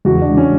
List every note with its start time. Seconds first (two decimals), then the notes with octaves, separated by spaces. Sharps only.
0.05 E2 C#3 E3 G#3 F#4
0.22 D4
0.37 C#4